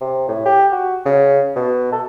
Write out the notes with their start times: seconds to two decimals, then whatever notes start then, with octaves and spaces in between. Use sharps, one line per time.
0.01 C3
0.28 A2
0.46 G4
0.72 F#4
1.05 C#3
1.56 B2
1.92 A4